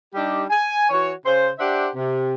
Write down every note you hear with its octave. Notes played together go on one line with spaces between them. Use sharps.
G3 D4 D#4 G4
G#5
E3 F#4 C#5
C#3 C5
D4 G4 C5 E5 F#5
C3